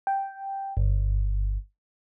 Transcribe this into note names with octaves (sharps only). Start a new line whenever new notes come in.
G5
G1